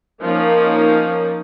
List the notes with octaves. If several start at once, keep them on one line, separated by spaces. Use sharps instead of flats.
F3 A#3 C#4 D#4